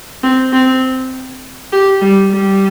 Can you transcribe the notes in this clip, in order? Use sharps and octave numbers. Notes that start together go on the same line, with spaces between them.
C4
C4
G4
G3
G3